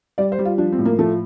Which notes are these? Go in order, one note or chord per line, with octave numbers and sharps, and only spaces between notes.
G3 D5
C5
G3
F4
F3 D4
C4
A2
A#3
F3 A3